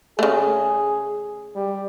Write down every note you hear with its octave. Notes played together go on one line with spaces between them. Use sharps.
C#3 A3 G#4
G3